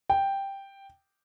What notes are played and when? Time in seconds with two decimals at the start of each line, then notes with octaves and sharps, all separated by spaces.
0.10 G5